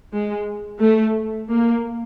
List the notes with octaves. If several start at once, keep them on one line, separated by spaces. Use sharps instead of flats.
G#3
A3
A#3